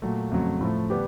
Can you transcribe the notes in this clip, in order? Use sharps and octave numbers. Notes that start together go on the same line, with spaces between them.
A#2 F#3 A3
F2 C#3 F#3 A3
A2 F3 A3
D3 G3 B3 D4 G4